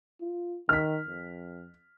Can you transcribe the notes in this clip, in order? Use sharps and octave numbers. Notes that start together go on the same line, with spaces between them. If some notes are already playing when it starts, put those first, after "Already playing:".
F4
D#3 F6 B6
F2